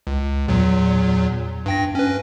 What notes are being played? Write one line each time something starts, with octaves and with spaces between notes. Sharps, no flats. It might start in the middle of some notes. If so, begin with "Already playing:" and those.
C#2
E2 A#2 F#3
G2 G5 A#6
C#4 B4